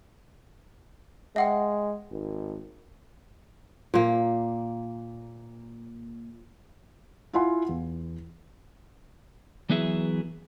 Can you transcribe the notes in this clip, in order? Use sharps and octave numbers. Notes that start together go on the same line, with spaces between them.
G#3 E5 F#5 G5
G#1
A#2 A#3
E4 F4 F#5 G#5 C6
E2
E3 F#3 B3 E4 G#4 E5